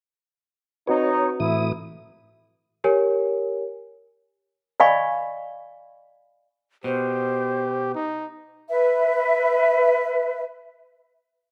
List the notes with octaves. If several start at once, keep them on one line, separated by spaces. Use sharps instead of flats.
C4 D#4 F#4 B4 C#5
A2 E3 E4 D#6
G4 A#4 C#5 G#5
D5 D#5 F5 G#5 B5 C#6
B2 G4 C5
D#4
B4 E5